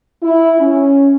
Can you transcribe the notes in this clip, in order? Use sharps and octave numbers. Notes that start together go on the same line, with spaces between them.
E4
C#4